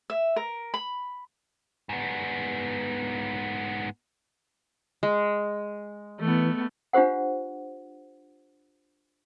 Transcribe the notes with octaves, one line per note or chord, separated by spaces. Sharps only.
E5
A#4
B5
G#2 B3
G#3
E3 A3 B3
D4 F4 G4 C5 F#5